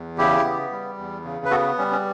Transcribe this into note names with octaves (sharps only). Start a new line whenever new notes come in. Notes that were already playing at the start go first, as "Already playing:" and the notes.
Already playing: E2
C#3 E4 G4
B3
G3
E2
C#3
B4
B3 F#4 A4
G3 C#4
C#4